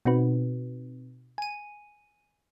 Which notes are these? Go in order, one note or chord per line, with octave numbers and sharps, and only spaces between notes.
B2 C4 D#4 F#4 B4
G#5 D#7